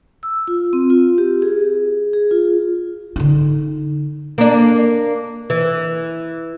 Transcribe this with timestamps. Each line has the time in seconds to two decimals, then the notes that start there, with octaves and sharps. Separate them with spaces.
0.23 E6
0.48 F4
0.73 C4
0.90 F4
1.18 G4
1.42 G#4
2.13 G#4
2.31 F4
3.16 D3 D#4
4.38 A#3 D4
5.50 E3